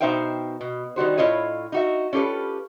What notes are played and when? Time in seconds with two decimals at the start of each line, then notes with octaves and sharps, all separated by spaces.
0.01 B2 D#4 C5 E5 F5 G5
0.61 B2
0.96 D#3 G3 F#4 C5
1.18 A2 E4 F4 C#5 D#5
1.72 D#4 F#4 E5
2.13 C#4 F4 G4 A4 B4